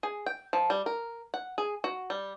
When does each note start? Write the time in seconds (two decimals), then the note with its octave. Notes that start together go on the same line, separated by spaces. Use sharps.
0.03 G#4
0.26 G5
0.53 F3
0.70 G3
0.86 A#4
1.34 F#5
1.58 G#4
1.84 F#4
2.10 G3